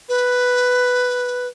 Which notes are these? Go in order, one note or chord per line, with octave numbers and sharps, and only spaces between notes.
B4